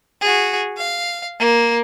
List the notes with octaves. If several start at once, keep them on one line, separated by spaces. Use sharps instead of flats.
F#4 G#4
F5
A#3